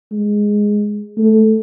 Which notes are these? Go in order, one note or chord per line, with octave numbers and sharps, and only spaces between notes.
G#3
A3